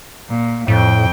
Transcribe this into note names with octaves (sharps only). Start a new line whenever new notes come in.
A#2
F2 A2 G5